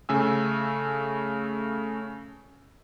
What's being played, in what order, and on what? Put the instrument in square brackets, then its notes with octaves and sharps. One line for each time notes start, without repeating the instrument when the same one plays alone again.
[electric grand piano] C#3 A3 G#5 E6